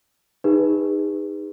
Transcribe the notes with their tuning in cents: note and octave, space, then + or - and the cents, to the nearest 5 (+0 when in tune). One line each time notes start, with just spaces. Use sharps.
D#4 +0 G#4 -40 B4 +0